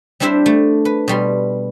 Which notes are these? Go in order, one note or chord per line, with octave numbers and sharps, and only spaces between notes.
G3 C4 D4 E4 C5 E5
A3
B4
B2 G3 C6